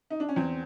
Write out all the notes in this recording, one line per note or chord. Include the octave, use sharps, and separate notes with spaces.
D#4
D4
C#4
E2 C4